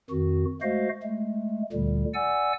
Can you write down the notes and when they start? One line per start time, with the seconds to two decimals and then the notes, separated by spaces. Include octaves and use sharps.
0.10 F2 D#3 F#4
0.62 G#3 A3 F#4 C5 D#5 F5
1.03 G#3 A3
1.73 D2 A#2 D3 G3
2.14 D5 F#5 G#5 E6